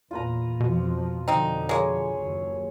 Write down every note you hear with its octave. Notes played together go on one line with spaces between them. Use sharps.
E2 A#2 F4 B4 A#5
F2 B2 F3
F2 D3 F3 C4 D#4
G#3 A#3 G#4 C#5 G#5
F#1 D#2